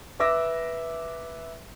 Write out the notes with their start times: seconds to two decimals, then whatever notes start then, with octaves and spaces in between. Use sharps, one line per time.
0.20 B4 E5 D6 E6 A#6